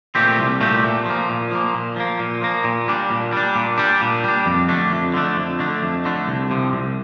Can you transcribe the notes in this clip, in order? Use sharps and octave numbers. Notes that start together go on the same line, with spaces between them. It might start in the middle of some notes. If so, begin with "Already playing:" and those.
A#2 A3 C4 G4
C2
A#2 A3 C4 G4
A#2
F3 A#3
A#2
F3 A#3
A#2
F3 A#3
A#2
F3 A#3
A#2
G3 D4
A#2
G3 D4
A#2
G3 D4
A#2
G3 D4
F2
D3 A3 D4
F2
D3 A3 D4
F2
D3 A3 D4
F2
D3 A3 D4
C2
C3 F3
C2